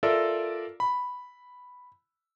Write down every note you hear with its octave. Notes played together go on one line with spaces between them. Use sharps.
F4 A4 A#4 D5 E5
B5